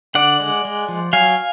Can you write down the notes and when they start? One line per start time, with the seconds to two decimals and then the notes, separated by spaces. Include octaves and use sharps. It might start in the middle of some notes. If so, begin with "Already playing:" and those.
0.15 D3 D5 F#5
0.40 G#3
0.65 G#3
0.89 F3
1.13 F#3 F5 G#5